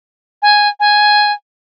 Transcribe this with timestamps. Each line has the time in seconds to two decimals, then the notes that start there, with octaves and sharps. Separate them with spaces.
0.42 G#5
0.80 G#5